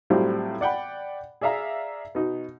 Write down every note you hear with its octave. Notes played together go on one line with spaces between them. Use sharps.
A2 F#3 G3 C4 F4 G4
D5 F#5 G5 B5
G#4 D5 E5 F5 A#5
B2 D#4